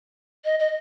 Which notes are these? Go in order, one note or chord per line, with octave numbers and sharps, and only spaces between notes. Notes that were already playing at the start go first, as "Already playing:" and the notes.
D#5
D#5